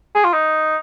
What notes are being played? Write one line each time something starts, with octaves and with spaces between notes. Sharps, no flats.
G#4
F4
D#4